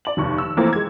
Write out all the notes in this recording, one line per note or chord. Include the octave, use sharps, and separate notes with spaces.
D5 F#7
F1 D#2 C#6
E6
E3 F3 A3 A#3 C4 A#4
G#3 G#6